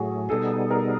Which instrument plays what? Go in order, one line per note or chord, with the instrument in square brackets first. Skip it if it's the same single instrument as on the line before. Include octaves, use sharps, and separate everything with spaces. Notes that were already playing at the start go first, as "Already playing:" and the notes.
Already playing: [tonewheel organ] A2 F#3 A3 [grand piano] F#4 G#4
[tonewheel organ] B2 G3 B3 D#4 G#4 [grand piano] A4
[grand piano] A#4